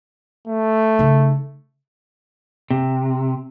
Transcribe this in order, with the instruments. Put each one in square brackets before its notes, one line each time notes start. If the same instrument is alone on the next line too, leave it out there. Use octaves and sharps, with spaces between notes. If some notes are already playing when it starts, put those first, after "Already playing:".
[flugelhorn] A3
[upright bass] C#3 D#4
[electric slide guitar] C3